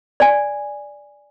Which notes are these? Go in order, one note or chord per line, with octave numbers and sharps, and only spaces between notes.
D5 G#5